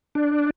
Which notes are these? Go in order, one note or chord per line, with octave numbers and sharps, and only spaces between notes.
D4